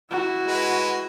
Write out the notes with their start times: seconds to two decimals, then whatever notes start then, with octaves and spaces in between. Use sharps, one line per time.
0.11 E4 F#4
0.47 G#3 B4